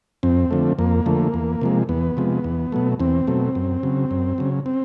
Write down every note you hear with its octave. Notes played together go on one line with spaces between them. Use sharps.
F2 C4
D3 F3 A3
F2 A#3
D3 F3 A3
E2
C3 F3 G#3
E2 B3
C3 F3 G#3
E2
B2 F#3 A3
E2 C4
B2 F#3 A3
F#2
C#3 F#3
F#2
C#3 F#3
C4